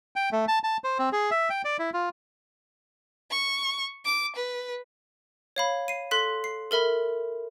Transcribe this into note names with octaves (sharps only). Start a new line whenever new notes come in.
G5
A3
A5
A5
C5
C4
G#4
E5
G5
D5
E4
F4
C#6
D6
B4
C#5 F5 B5
C7 D#7
A4 C6 F#6 B6
C7
A4 A#4 E5 B5